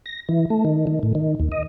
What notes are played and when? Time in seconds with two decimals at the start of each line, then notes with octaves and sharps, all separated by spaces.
0.06 A#6
0.29 E3
0.50 A3
0.65 D#3
0.87 D#3
1.03 A2
1.15 D#3
1.40 D#2
1.52 D#5